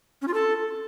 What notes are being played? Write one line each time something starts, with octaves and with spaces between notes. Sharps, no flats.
C#4
F4
A4